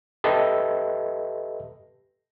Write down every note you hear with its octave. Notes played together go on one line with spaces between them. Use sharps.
G4 A4 B4 D#5 E5